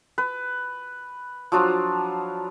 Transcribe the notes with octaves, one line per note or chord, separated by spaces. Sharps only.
B4
F3 F#3 D4 F4